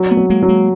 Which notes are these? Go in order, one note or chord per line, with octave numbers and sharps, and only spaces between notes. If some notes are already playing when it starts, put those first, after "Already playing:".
Already playing: F#3
A3 B3
F#3
G#3 A#3
F#3
G#3 A#3